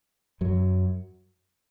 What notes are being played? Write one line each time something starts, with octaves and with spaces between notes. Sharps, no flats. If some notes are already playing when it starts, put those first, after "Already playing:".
F#2 F#3